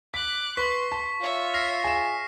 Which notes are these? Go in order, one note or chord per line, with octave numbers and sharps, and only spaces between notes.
D6 F#6 B6
B4 C6 C#6 B6
A5
F4 C#5 E5
F6 A#6 C7 F7
G#4 E7